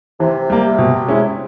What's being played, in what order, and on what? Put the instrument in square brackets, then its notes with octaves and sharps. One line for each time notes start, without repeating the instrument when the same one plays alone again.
[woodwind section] C3 [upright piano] E3
[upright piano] G3 A#3
B2
G#3 C#4 E4